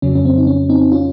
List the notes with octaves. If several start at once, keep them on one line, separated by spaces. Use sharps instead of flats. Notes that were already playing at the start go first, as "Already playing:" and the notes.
F2 C#3 F#3 C#4
C#4
C4
D#4
C#4
C4 D#4
C#4 F4